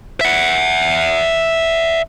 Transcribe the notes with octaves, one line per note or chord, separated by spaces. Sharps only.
E5 F#5